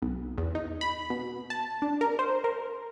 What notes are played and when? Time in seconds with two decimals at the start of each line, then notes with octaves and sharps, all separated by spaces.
0.02 B1
0.38 E2
0.55 D#4
0.81 B5
1.10 B2
1.50 A5
1.82 D4
2.01 A#4
2.19 C5
2.44 A#4